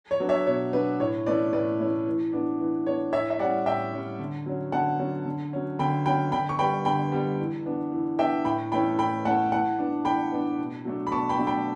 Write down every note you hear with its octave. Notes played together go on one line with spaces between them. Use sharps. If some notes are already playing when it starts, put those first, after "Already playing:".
C#5
F#3 B3 D4
C#5 E5
B2 C#5
F#3 B3 D4 B4
A2 C#5
E3 A3 C#4 B4 D5
A2 B4 D5
E3 A3 C#4
E3
B3 D4
E3
B3 D4 C#5
A2 C#5 E5
E5
G3 C#4 D5 F#5
A2 E5 G5
G3 C#4
D3
F#3 C#4
D3 F#5 A5
F#3 C#4
D3
F#3 C#4
D3 G5 B5
F#3 C#4 G5 B5
D3 G5 B5
C#6
G3 B3 G5 B5
D3 G5 B5
G3 B3
E3
B3 D4
E3
B3 D4 E5 G5
A2 G5 B5
E3 A3 C#4 G5 B5
A2 G5 B5
E3 A3 C#4 F#5 A5
E3 F#5 A5
B3 D4
E3 G5 B5
B3 D4
B2
F#3 A3 D4
B5
B2 A5 C#6
G5 B5
F#3 A3 D4
G5 B5